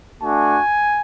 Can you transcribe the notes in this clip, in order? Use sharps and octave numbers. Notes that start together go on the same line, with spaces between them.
A3 D4 F#4 G#5